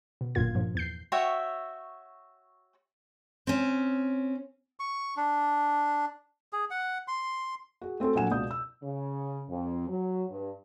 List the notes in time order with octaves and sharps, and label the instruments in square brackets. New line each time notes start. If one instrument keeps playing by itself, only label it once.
[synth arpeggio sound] B2
G1 F#2 A#2 F4 G#6
G2 A#2 F3
E2 G6 C7
[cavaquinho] F#4 C#5 E5 G5
[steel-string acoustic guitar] C4 C#4
[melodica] C#6
D4
G#4
F#5
C6
[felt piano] F#4 G#4
A3 C4 C#4 F#4 A4
A#1 F#3 A4 F#5 G#5 E7
C#2 B2 D5 D#6 G6
E6
[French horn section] C#3
F2
F#3
G2